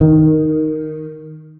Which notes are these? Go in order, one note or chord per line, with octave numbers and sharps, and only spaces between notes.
D#3